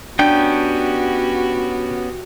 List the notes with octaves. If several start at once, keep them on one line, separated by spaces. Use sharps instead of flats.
B3 C#4 D4 F#4 G4 G5 G6